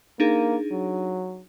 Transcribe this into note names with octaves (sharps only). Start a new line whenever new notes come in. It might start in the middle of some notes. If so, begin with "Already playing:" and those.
A#3 D4 D#4 G#4
F#3